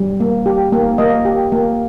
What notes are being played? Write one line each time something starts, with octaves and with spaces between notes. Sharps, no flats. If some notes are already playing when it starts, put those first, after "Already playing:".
Already playing: G3
A#3
G4
A#3
A#3 D#5
G4
A#3